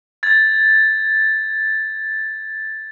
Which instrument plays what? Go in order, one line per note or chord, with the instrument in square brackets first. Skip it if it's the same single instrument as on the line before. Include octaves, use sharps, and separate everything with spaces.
[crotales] G#6 A6